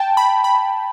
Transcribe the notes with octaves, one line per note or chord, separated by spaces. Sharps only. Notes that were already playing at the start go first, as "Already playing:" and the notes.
Already playing: G5 A5
B5
B5